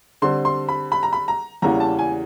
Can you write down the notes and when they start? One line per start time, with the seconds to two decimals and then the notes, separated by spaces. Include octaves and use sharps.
0.22 D3 G3 C4 C6
0.45 C6
0.69 B5
0.92 B5
1.03 A#5
1.13 B5
1.28 A#5
1.62 E2 C#3 E3 G3 A#3 A#5
1.80 A5
1.99 G#5